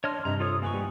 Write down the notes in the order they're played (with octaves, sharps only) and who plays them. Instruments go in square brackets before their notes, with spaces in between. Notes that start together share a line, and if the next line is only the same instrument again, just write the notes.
[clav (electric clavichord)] D4 [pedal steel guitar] C#5 D#5 F6 [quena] C6
[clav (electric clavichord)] G2 C3 [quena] D#5 [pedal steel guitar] A#5
[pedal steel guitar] F4 A4 C#5 [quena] D#6
[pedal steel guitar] A#3 B4 C#6 [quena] G#5
[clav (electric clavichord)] G3